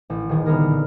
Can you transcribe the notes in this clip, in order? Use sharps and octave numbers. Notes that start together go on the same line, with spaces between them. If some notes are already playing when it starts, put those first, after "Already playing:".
A1
D#1 D#3 G#4
C2 D3 B3 G#4 A#4 F6
A#2